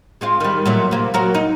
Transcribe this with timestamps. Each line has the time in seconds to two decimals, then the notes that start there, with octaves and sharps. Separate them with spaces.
0.21 G#3 C4 F4
0.40 D#3 G3
0.66 A#2 F#3 A3
0.91 C3 A#3
1.14 F#3 F#4 A#4
1.34 D#4